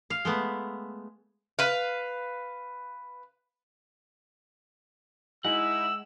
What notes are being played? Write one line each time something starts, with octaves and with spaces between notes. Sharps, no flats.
F5
G#3 A3 B3
B4 F5
G#3 D#4 E4 F#5 E6